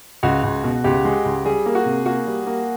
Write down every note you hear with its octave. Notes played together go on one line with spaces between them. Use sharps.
C#2 F#4
C#2
B2
C#2 G4
G#3
C#2
G3 G#4
A#3
F#4
C3
A#3 F#4
G3
A#3